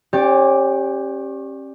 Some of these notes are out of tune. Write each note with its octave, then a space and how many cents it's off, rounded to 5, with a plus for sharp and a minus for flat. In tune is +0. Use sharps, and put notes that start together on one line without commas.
C#4 -35 G4 +0 D5 +0